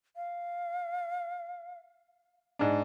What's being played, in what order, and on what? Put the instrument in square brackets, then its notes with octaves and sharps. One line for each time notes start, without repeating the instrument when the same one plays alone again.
[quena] F5
[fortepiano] G#2 D4